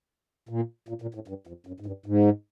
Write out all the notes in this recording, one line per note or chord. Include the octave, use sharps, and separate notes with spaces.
A#2
A#2
A#2
A2
G2
F2
F#2
G#2
G2
G#2